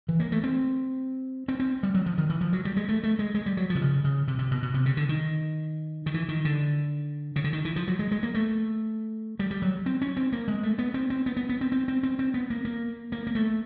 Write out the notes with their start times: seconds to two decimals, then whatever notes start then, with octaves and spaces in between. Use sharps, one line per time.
0.09 E3
0.20 A#3
0.32 A3
0.44 C4
1.48 C4
1.60 C4
1.83 G3
1.94 F#3
2.06 F3
2.18 D#3
2.29 E3
2.41 F3
2.53 F#3
2.65 G3
2.77 G#3
2.88 A3
3.03 A3
3.19 G#3
3.35 G#3
3.46 G3
3.57 F#3
3.70 F3
3.75 C3
3.82 C#3
4.04 C#3
4.28 C3
4.39 C3
4.51 B2
4.62 B2
4.74 C3
4.86 C#3
4.97 D3
5.09 D#3
6.06 D#3
6.14 E3
6.29 D#3
6.45 D3
7.36 C#3
7.44 D3
7.53 D#3
7.65 E3
7.76 F3
7.88 F#3
7.99 G#3
8.11 G#3
8.23 A#3
8.34 A3
9.39 G3
9.51 G3
9.62 F#3
9.86 C4
10.01 C#4
10.17 C4
10.32 A#3
10.48 G#3
10.63 A3
10.78 B3
10.94 C4
11.10 C4
11.26 B3
11.37 B3
11.49 B3
11.61 C4
11.72 C4
11.88 C4
12.03 C4
12.19 C4
12.34 B3
12.50 A#3
12.65 A#3
13.12 A#3
13.27 A#3
13.35 A3